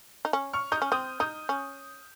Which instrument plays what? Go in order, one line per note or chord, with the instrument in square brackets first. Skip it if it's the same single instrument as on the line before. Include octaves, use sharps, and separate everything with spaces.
[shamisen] D#4
C#4
[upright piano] C#6 F6
[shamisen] D#4 [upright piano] D#6 G6
[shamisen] C#4
[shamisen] C4 [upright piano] D#6 G6
[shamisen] D#4 [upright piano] D#6 G6
[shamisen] C#4